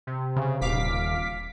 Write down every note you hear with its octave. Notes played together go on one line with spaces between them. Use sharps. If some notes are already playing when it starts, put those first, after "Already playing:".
C3
C#3
D#1 F5 D6 B6